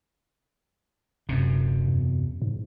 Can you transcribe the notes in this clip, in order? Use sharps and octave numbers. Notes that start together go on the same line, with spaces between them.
D#1 F#2 C3
E2
G#2